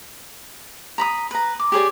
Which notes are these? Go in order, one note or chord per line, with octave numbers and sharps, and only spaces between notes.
A#5 B5 D#6
B4 A#5
D6
G4 G#4 C#5 D5